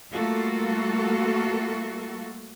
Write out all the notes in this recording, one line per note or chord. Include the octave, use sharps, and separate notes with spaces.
G3 A3 A#3 F4 F#4 A4